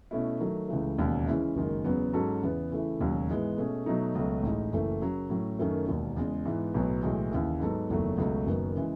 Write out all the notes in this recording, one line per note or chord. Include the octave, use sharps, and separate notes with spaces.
B2 A3 C#4 E4
D#3 F#3 A3
C#2 C#3 E3 A3
E1 D#2 C#3
C#3 E3 G#3 C#4 E4
F#1 F#2 D#3 G#3
E2 C#3 F#3 B3
G#2 F#3 C#4 F#4 A4
E2 C#3 E3 B3
C#3 E3 A3 E4
E1 D#2 C#3 F#3
G#2 E3 G#3 B3
B2 A3 C#4 G#4
B2 F#3 A3 D#4
C#2 B2 F#3 A3
A1 A2 G#3 D#4
F#1 F#2 E3 A3
F#2 C#3 F#3
A2 F#3 C#4
F#2 D#3 A3 C#4
E1 D#2 D#3
E2 C#3 G#3
G#2 E3 B3
B1 A2 F#3 B3
B1 A2 E3 G#3
D#2 C#3 E3
G#2 F#3 B3 D#4 A4
F#1 E2 D#3 F#3 A3
C#2 B2 F#3 A3
F#1 F#2 D#3 F#3 B3
C#3 E3 G#3